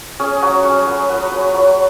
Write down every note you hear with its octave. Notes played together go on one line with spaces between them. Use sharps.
C#4 G#4
F#3 F#4
C#4 G#4
F#3 B4
F#3 B4
F#3 B4
F#3 D5